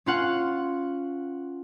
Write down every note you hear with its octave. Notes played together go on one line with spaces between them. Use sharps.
C#4 F4 F#5